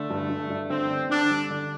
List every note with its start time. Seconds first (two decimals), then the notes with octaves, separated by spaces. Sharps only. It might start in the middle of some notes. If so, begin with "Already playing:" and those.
Already playing: D3 A3
0.10 G2
0.30 G2
0.50 G2
0.70 D3 C4
0.90 D3
1.10 D3 D4
1.30 G3
1.50 D3